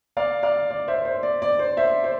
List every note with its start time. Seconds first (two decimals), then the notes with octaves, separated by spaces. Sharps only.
0.17 D5 F5
0.43 D5 F5
0.71 D5
0.88 C5 E5
1.05 C5
1.23 D5
1.42 D5
1.59 C5
1.77 C5 E5
2.04 C5